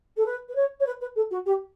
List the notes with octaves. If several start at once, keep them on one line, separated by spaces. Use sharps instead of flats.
A4
B4
B4
C#5
C#5
B4
B4
A4
F#4
G4